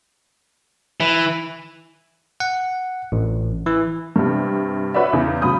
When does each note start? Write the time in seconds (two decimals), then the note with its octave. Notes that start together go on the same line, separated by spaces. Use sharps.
1.00 E3
2.40 F#5
3.12 A1
3.66 E3
4.16 G2 C3
4.94 F#4 B4 C#5 D5 E5
5.13 E2 C#3
5.41 C#3 F#3 B5 D#6 G6